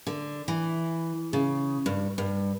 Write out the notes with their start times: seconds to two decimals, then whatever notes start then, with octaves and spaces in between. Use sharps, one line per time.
0.07 D3
0.48 E3
1.33 C#3
1.86 G2
2.18 G2